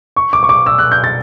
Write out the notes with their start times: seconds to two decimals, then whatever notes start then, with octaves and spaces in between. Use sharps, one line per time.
0.16 C#6
0.33 D6
0.43 C#6
0.49 D6
0.66 E6
0.78 F#6
0.92 G6
1.04 A6